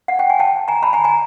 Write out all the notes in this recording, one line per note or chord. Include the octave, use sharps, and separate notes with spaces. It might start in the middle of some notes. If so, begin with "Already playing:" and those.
F#5
G5
G#5
G5 A5
G#5 A#5
A5 B5
G#5 A#5
G#5 A#5